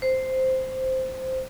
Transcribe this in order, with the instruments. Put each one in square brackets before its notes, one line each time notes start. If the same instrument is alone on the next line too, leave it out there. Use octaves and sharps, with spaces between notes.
[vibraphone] C5